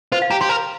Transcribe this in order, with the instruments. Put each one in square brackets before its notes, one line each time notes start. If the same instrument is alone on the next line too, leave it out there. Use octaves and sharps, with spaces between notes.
[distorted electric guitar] F4 [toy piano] C5
[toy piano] F5
[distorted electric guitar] G4 [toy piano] A#5
[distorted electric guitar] G4 [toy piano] C6
[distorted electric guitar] A#4 [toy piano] A#5